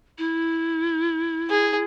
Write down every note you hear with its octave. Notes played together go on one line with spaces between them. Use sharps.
E4
G#4